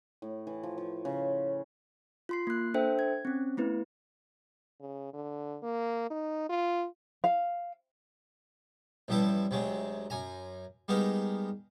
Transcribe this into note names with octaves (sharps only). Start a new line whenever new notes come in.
A2
E3
F3
F3
C#3
F4 C6 C7
A#3 F#6
D4 A4 C5 E5 G5
G#6
C4 C#4
A3 B3 E4 B4
C#3
D3
A#3
D#4
F4
F5
A1 G2 F3 G3 E4 A5
D2 C3 F#3 G#3
F#2 G#5 A#5
G3 G#3 B3 D#4 A#4